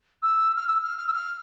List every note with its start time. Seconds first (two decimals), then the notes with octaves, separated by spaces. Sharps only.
0.22 E6
0.56 F6
0.67 E6
0.83 F6
0.98 F6
1.07 E6
1.13 F6